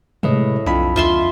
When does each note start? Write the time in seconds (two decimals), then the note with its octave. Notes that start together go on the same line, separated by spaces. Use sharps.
0.23 A2 C3 G#3 B4 D#5
0.66 B1 F2 D4 D#5 B5
0.96 C#2 F4 E5 C6